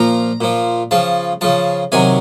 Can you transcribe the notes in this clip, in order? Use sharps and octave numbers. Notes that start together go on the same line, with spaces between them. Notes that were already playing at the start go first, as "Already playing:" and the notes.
Already playing: A#2 F3 A#5
A#2 F3
C#3 F3 A5
C#3 F3 A5
C3 D#3 F#3 G#5